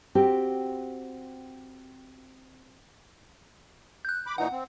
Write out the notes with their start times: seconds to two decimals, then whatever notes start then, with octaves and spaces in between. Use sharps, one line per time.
0.15 C4 F#4 G4
4.05 F#6 G6
4.26 B5 D6
4.38 A#2 E3 D#4 F#5
4.52 C4